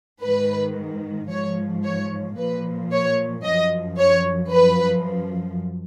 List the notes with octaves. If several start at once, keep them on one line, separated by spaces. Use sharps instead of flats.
G#2 D#3 B4
G#2 F3 C#5
C#5
A#2 F3 B4
C#5
F#2 F3 D#5
C#5
F#2 F3 B4